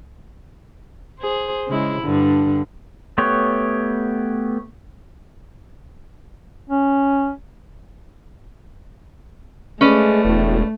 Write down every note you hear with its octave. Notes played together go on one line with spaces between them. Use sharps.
G#4 C5
C#3 G#3 E4
G2 D3
A3 B3 G4 C#5
C#4
G#3 A3 C#4 B4 D5
E1 A2